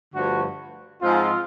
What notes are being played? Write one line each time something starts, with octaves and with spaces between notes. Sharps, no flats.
G2 D3 F3 A3 F#4
G#2 F3 G#3 C4 F4